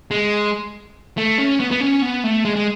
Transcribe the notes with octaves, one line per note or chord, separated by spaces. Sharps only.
G#3
A3
C#4
B3
B3
C#4
B3
A3
G#3
G#3